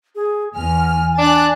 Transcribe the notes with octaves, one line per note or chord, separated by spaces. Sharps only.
G#4
E2 G#5 F6
D4 F#6 A6